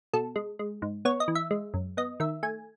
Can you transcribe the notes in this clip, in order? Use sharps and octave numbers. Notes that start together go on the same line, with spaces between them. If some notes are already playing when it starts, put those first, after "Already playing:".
B2 A4
G#3
G#3
G#2
B3 C#5
D#5
E3
E5
G#3
F#2
B3 D#5
D#3 E5
A3 G#5